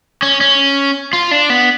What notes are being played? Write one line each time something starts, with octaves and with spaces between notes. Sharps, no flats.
C#4
C#4
F4
D4
B3